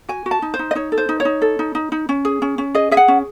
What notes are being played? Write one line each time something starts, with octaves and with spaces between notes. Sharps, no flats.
F#4 G#5
F#4
A5
D#4
C5
D#4
D#5
D#4 C#5
A4
C5
D#4
C#5
D#4
A4
D#4
D#4
D#4
C#4
G#4
C#4
C#4
G#4 D#5
G#4 E5
F#5
C#4